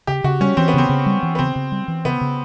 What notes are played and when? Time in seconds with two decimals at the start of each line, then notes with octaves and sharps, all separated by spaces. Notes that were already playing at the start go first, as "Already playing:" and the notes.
0.07 C#3 G4
0.24 C#3 F#4
0.41 G3 C#4
0.57 E3 C4
0.68 B3
0.74 C#3 C4
0.89 C#3
1.06 G3
1.23 E3
1.35 B3
1.39 C#3 C4
1.56 C#3
1.72 G3
1.88 E3
2.05 C#3 B3
2.21 C#3